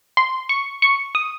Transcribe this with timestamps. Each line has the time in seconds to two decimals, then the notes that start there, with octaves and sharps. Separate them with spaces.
0.17 C6
0.49 C#6
0.82 C#6
1.15 D#6